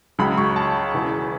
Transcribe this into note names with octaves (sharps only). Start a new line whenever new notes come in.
C#2 C#3 F#3 B5
C#6
A5
E1 E2 C#3